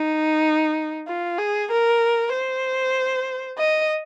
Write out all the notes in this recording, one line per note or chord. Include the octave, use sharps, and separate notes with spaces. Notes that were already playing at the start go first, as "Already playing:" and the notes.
Already playing: D#4
F4
G#4
A#4
C5
D#5